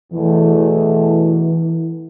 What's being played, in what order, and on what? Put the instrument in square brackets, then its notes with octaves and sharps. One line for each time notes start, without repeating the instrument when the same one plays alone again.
[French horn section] E2 B2 A3 [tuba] E3
[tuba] E3